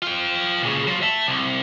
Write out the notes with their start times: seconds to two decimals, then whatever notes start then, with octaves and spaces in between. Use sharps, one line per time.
0.02 F4 G5
0.63 A#2 C#3
0.87 F#3 F4
1.02 E5 A5
1.27 C2